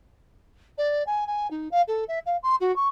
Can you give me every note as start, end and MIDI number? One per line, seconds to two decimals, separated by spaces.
0.78 1.03 74
1.07 1.27 80
1.27 1.50 80
1.51 1.68 63
1.71 1.82 77
1.88 2.04 69
2.08 2.19 76
2.26 2.37 77
2.43 2.56 84
2.60 2.74 66
2.76 2.88 85